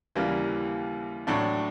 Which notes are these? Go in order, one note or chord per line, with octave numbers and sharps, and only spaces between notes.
D#2 C#3 E3 G3 A#3
A2 F#3 A3 D4